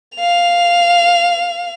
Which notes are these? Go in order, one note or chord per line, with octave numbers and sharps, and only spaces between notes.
F5 F7